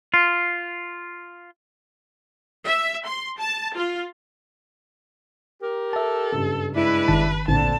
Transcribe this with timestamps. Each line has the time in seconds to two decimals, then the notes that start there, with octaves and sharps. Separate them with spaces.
0.14 F4
2.67 E5
3.05 C6
3.39 A5
3.75 F4
5.61 G4 A#4
5.93 A4 E5 A5
6.32 F#1 G2
6.76 G#3 D4 E4 B4
7.08 G1 D#3 A5
7.48 A1 D2 A#2 D3 C4 A5